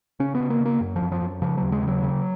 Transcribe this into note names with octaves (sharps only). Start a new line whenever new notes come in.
C#3 C#4
B3
C#3
A#3
C#3 A#3
F#2
F3
F#2
F3
F#2
C#3 F3
D#2 F#3
G#3
C#3 F#3
C#3